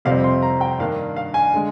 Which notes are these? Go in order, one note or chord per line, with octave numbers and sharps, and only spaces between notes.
F2 C3 G3 C4 F5
C6
A#5
G5
G2 D#3 A#3 D4 F5
F5
G#5
D3 G#3